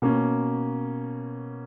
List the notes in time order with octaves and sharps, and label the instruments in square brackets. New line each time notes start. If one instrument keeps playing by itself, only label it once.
[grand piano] B2 A#3 C#4